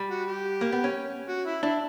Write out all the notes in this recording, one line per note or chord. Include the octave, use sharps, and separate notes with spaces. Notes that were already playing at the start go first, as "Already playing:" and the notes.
Already playing: G3
F#4
G4
A#3
B3
C#4
F#4
E4
D4 E4